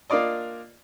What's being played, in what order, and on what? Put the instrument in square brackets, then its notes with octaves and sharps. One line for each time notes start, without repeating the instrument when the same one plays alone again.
[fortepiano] A#3 D4 F4 D5 D#5